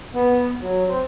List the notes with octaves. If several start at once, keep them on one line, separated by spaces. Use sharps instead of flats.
B3
F#3
C4